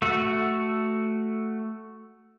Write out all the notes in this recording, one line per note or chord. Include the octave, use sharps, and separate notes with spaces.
A3 F#4